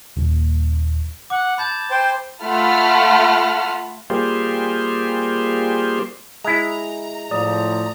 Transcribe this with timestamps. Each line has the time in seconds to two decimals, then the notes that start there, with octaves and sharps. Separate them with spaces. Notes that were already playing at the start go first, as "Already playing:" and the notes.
0.17 D#1
1.30 F#5 D6
1.58 A5 B5 G6 G#6
1.91 C5 G5
2.44 A3 F4 F#5 A5 B5 F6
4.10 G3 A#3 F4 G4 G#4 C5
6.44 G#3 E4 A#5
7.31 A2 F3 D5 D#6